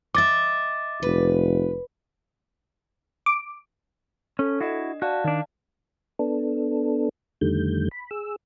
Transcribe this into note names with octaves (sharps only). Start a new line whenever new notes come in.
D#5 E5 D6 A6
F1 B4
D6
C#4 A4
D4 E4 F#4 D#5
F#4 D5 F5 A5
D#3 D4
B3 D4 A4
F2 D3 D#3 G3 A3 G6
B5
G#4 E6